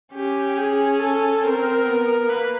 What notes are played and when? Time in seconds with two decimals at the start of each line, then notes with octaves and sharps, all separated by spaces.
0.13 C#4 G4
0.57 G#4
1.00 A4
1.43 C4 A#4
1.86 B3
2.28 A#3 B4